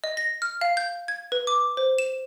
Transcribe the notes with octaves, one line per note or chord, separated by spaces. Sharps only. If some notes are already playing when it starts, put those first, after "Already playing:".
D#5
A#6
F6
F5
G6
G#6
B4
D6
C5
E7